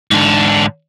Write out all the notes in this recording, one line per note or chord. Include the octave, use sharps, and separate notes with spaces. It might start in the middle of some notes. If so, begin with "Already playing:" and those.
G#2 D3